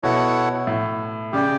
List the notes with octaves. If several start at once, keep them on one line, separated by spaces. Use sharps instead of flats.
B2 E4 A4 C#5 F#5
A2
C#3 G4 D5 G5